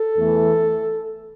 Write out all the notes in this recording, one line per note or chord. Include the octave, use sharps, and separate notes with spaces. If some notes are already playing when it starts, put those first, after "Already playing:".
Already playing: A4
E2 E3 A3